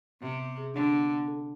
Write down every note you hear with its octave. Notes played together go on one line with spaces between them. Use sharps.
C3 B3
B3
G#4
D3 D4
B3
B3
A4